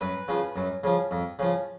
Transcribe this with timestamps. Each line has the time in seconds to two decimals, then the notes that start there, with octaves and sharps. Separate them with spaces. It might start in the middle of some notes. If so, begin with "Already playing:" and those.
0.01 F#2 B4
0.28 C#3 F3
0.56 F#2
0.84 C#3 F3
1.11 F2
1.39 C#3 F3